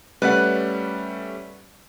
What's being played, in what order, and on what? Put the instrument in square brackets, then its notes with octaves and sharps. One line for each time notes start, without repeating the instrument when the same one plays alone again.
[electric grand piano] G3 A3 C#4 [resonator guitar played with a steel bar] B4 D5 F#5